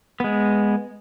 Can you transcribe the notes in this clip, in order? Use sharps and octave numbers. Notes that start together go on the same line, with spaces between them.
G#3 B3